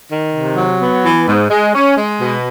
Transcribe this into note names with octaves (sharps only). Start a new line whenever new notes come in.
D#3
C3
F#3
B3
E3
G#2
G#3
C#4
G#3
B2